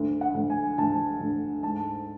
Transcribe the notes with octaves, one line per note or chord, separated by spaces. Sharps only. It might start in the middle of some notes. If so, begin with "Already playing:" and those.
Already playing: D2
F#5
D2
G#5
D2 A5
D2
G#2 A5